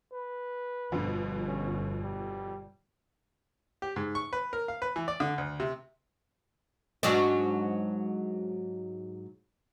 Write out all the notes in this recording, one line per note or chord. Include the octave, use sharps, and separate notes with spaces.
B4
G1 F2 B2 D3
C#4
G3
G4
G#2
C#6
B4
A#4
F5
B4
E3
D5
D3
D2
C3
G#2 F#3 D4